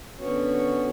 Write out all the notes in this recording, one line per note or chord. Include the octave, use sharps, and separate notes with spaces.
D3 B3 C#4 F#4 C#5